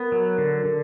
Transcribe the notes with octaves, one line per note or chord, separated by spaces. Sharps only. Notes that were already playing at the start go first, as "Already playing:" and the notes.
Already playing: B3 A#4
F#3
D3
D3